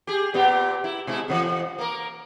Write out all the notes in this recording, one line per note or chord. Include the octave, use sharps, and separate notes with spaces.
G4 G#4
A#2 B3 G4
E4
B2 G#3 E4
F2 C#3 E3
A#3 A#4